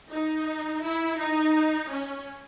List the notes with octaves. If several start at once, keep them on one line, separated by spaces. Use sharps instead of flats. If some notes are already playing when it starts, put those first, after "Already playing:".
D#4
E4
D#4
C#4